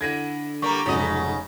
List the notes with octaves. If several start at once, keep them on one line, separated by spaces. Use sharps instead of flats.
D3 D4 E4 G#6 A#6 D#7
G3 A#3 A#5 C#6
F1 B1 G#2 C#3 F#4 A4 D#5